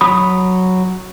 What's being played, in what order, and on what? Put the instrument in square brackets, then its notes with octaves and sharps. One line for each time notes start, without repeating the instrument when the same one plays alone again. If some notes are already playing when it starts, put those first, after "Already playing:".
[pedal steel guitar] F#3 B5 D#6